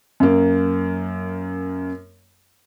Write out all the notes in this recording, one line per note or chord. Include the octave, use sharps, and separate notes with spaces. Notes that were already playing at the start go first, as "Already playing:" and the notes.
F#2 A#3